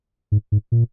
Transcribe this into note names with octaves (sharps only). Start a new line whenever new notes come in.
G#2
G#2
A#2